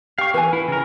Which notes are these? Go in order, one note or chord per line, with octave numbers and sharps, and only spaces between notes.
G4 F5 G5 C#6
E3 B4 G#5
E4
C#3 A#4